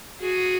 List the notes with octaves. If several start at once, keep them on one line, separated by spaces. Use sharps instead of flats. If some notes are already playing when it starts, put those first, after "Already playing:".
F#4 G#4